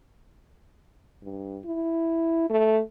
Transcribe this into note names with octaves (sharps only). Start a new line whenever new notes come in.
G2
E4
A3